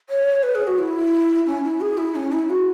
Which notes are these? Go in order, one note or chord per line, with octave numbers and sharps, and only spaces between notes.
C#5
B4
G#4
F#4
E4
C#4
E4
G#4
E4
C#4
E4
F#4